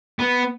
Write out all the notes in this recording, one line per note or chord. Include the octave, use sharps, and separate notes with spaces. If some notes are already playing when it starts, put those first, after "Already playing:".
B3